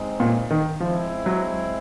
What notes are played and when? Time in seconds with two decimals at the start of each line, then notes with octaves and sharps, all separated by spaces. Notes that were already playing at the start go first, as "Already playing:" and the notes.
Already playing: G#3 C4 D#4
0.20 A#2
0.51 D#3
0.80 F3 G#3 C4 E4
1.26 F#3